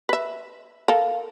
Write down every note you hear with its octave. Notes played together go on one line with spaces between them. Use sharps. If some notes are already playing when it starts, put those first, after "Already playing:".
B4 E5
A4 A#4 F5